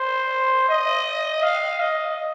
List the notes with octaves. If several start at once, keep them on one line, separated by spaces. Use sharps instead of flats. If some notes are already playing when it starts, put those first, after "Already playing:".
Already playing: C5
D#5
F5
D#5